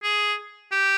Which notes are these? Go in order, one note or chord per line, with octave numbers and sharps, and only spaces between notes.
G#4
G4